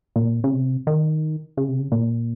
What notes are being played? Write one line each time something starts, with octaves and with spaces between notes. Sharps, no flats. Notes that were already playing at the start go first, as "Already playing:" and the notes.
A#2
C#3
C3
D#3
C#3
C3
C#3
A#2